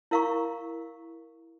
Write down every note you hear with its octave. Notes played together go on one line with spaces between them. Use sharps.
E4 A#4 F5 A#5 C#6